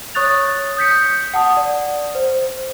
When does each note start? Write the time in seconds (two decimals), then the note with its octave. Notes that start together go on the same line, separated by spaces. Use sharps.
0.15 C#5 C#6 D#6 F#6 A6 F7
0.77 D#6 G6 B6 C#7
1.34 F#5 A5 D#6
1.57 D5
2.15 C5